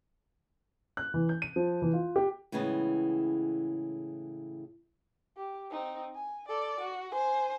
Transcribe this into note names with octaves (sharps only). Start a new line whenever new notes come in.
F#6
E3
G6
D#7
F3
E3
F4
G4
A2 C#3 E3 G#3 B3
G4
C4 D#4
G#5
A4 D5
F#4
C5 G#5